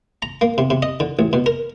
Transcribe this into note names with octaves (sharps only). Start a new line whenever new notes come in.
A#5
A#3
C3
C3
D#5
D3
A1
B2
A#4